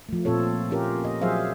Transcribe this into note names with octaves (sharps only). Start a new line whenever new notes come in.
F3 A3
A#2 C4 F4 A4 C#5
C#4 F4 G4 A#4
D#5
F3 F#3 G#4 C5 E5 F5